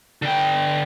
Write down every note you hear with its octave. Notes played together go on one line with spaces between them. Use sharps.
D3 G5